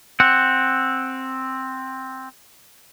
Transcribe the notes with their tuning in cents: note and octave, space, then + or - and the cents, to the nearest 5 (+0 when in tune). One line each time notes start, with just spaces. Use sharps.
C4 +5 F#5 +0